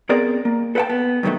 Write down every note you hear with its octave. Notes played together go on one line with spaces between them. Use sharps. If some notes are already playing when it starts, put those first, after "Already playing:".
B3 C4 G#4 A#4 D5
A#3
A4 B4 C5 F#5 G5 A5
B3
G2 B2 D#3 E3 F#3 A3